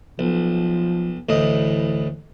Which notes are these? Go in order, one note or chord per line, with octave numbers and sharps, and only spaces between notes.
B1 F3
D2 A2 E3 D#5